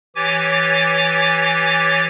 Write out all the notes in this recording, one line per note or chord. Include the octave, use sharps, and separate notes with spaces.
E3 G4 C#5 G#5 D6 A6